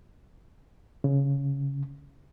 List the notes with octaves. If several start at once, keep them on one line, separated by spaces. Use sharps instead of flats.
C#3